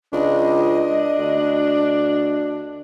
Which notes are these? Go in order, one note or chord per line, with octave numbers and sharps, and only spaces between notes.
C#2 D4 D#5
D2